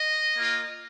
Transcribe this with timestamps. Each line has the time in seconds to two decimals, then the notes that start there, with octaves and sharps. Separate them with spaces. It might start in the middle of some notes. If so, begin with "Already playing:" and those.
Already playing: D#5
0.35 A#3 F4